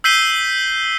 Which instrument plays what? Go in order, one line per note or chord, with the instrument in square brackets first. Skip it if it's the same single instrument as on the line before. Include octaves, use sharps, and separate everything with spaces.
[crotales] E6 G6 B6 C7 D#7 G7